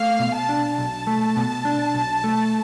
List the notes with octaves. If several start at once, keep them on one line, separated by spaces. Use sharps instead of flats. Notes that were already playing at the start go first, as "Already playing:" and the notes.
Already playing: A3 F5
B2
A5
D4
B1 A5
A3
B2
D4
B1
A3